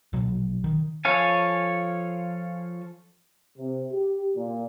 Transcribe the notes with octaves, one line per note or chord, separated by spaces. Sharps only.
A#1 B2 F#3
D#3
F3 A4 C#5 F5 G#5
C3
G4
A#2